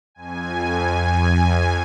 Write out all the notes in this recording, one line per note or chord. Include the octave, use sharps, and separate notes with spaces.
F2 G#5